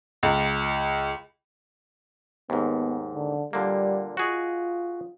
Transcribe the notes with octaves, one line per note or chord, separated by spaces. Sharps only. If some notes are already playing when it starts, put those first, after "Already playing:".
C#2
D#2 G#2 B3
D3
A#2 D3 G3 A#3
F4 F#4 G#4 D#5